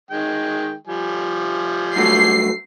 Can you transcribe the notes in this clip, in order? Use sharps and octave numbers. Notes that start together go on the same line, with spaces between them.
D#3 G#3 G5
F3 G3 G#5
G2 F#3 A3 C7